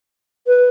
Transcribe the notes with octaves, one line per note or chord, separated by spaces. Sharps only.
B4